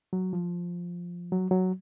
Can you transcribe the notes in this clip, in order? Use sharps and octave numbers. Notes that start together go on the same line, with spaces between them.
F#3
F3
F#3
F#3